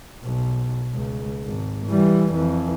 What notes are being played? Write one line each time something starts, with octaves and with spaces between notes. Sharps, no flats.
B1
C#2
G#1
E3 G3
F2 E3